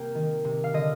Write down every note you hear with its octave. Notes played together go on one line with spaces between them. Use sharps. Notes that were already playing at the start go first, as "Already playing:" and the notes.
Already playing: C3 A#3 G5
D#3
C3
F5
D3 D#5